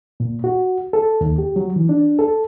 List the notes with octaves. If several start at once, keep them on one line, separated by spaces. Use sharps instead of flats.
A#2
F#4
A4
D#2
G4
F#3
E3
D4
A4